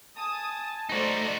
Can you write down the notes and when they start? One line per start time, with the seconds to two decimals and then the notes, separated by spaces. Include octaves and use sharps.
0.17 G#5 A5 D#6
0.89 A3 D#4 F#4 C5 D5